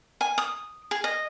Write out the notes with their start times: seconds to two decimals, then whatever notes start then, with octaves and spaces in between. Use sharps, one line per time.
0.21 G#5
0.38 D#6
0.91 G#4
1.04 D#5